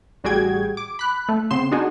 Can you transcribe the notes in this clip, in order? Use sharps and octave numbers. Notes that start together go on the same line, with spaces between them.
A1 G3 F#4 G#4 G5 G#6
D6
B5 F#6
A3
C#3 B3 C4 C6 E7
D4 D#4 F#4 G#4